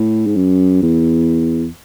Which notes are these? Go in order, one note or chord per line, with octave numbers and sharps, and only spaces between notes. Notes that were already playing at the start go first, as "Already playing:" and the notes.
Already playing: A2
G#2
F#2
E2